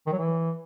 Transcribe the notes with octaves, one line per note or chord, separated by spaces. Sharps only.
D#3
F#3
E3